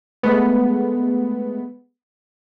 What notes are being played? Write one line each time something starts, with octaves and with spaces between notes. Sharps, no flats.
G#3 A3 B3